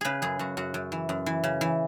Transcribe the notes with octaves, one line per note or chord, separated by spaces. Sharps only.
C#3 G#4 B4
F#2 G#4
F#2 F#4
F#2 F#4
F#2
E3
F#2
E3
C#3
E3